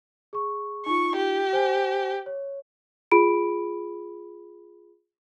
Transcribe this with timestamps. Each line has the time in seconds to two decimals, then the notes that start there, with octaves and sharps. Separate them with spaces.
0.33 G#4 C#6
0.86 D#4 F4 C#6
1.16 G4
1.53 C5 G#5
2.26 C#5
3.11 F4 G#4 B5 D7